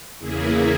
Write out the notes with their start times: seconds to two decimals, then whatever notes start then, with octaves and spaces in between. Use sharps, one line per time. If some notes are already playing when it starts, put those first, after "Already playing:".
0.19 E2 C#3 E3 A#3 E4 G#4